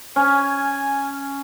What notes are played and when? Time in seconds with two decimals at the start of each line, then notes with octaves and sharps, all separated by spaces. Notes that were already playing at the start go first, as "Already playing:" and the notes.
0.16 C#4 G#5